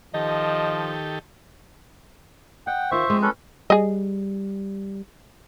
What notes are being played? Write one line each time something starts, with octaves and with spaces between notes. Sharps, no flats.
D#3 F3 G4 A4 D#5
D#5 F#5 G5
D#3 F4 C5 E5 C#6
F3 G#3 C4
C#4 A4 B4
G3 G#4 D#5